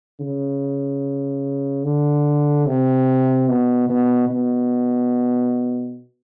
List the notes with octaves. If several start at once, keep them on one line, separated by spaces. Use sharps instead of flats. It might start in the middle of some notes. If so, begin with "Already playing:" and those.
C#3
D3
C3
B2
B2
B2